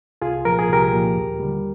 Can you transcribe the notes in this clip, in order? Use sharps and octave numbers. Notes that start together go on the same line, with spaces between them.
C2 F4 G#4
A#2 F3 A#4
G#4
C2 G4 A#4
A#2 F3
D#2
D3 G3